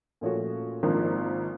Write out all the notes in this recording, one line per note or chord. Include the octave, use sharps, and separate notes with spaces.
A#2 F3 A3 C#4 F#4
G#1 G#2 F3 A#3 D4